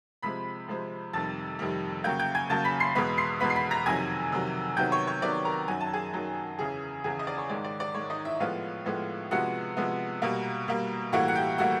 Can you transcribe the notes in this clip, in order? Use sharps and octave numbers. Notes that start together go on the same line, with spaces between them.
C3 F3 G#3 C4 B5 B6
C3 F3 G#3 C4
F2 C3 D#3 G3 A5 A6
F2 C3 D#3 G3
C#3 F#3 A#3 G5 G6
G5 G6
G#5 G#6
C#3 F#3 A#3 A5 A6
B5 B6
C6 C7
E2 B2 G#3 B3 B5 B6
C6 C7
E2 B2 G#3 B3 B5 B6
C7
B5 B6
A#5 A#6
F2 C3 D#3 F#3 G#5 G#6
F2 C3 D#3 F#3
C3 D#3 F#3 B3 G5 G6
C#5 C#6
C#5 C#6
C3 D#3 F#3 B3 D5 D6
A#4 A#5
F#2 D#3 F#3 G#5
A5
G#4 G#5
F#2 D#3 F#3
E2 C#3 E3 G#4 G#5
E2 C#3 E3 G#4 G#5
D#5
D5
C#5
G#2 D#3 G#3 D5
D5
D5
G#2 D#3 G#3 C#5
D#4 D#5
E4 E5
A2 F3 G#3 B3 F4 F5
A2 F3 G#3 B3
C3 F3 G#3 B3 F#4 F#5
C3 F3 G#3 B3
B2 G3 A#3
B2 G3 A#3
A2 E3 G3 A#3 F#4 F#5
F#5
G4 G5
A2 E3 G3 A#3 F#4 F#5